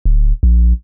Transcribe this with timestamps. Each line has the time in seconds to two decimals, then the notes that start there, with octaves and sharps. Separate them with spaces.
0.05 D1
0.43 A#1